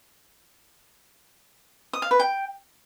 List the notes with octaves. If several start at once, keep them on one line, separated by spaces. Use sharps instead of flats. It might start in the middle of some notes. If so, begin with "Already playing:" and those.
D#6
F5
B4
G5